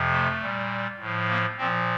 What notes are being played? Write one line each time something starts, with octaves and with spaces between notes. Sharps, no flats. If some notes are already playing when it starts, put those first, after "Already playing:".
Already playing: F2 C3 F3
A3
A#2 G3
A2 F3
A#3
A#2 F3 C4